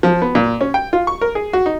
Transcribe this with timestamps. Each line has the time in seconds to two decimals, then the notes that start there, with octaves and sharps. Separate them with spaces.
0.03 F3
0.22 B3
0.35 A#2
0.61 C#4
0.74 G5
0.93 F4
1.07 C#6
1.21 A#4
1.35 G#4
1.53 F#4
1.66 D#4